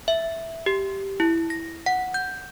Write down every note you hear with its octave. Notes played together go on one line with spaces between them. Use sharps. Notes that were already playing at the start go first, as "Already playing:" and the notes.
E5
G4
E4
A#6
F#5
G6